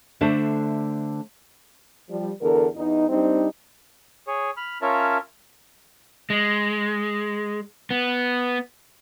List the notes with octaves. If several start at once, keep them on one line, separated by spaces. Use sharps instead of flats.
D3 A3 D4 C5 E5
F3 G3
E2 D3 A4 A#4
E2 D#4
G3 C4 D4 D#4
G#4 C#5
B5 F6
C#4 F4 A#4 C#5 E5 A5
G#3
B3